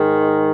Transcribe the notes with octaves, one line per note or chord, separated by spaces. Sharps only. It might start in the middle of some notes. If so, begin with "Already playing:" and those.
Already playing: G#2 D#3 G#3